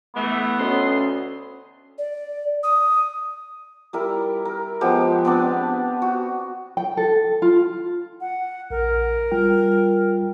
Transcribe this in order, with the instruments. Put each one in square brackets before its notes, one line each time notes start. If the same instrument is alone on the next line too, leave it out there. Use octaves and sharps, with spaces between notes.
[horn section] E3 A3 [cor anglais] B3
[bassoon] D2 [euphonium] C#4 [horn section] D#5 C6
[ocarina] D5
D#6
[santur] G3 E4 A#4
A#4
F3 G#3 B3 G4
B3 C4 D4
F#4
[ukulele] G5
A4
F4
[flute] F#5
[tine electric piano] A#1 [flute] A#4
[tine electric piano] G3 F4 G5